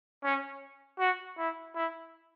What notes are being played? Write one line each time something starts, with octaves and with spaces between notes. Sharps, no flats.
C#4
F#4
E4
E4